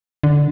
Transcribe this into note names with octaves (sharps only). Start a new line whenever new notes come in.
D3